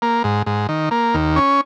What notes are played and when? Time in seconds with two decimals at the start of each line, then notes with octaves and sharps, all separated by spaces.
0.02 A#3
0.24 G#2
0.46 G#2
0.69 D#3
0.91 A#3
1.14 D#2
1.36 C#4